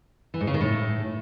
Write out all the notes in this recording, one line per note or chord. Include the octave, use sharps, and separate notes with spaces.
E3
G#2
C#3
D#3
A2